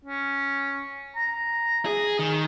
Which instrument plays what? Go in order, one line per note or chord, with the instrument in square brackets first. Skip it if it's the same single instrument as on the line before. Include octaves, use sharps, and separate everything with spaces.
[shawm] C#4
A#5
[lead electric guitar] G#4
D#3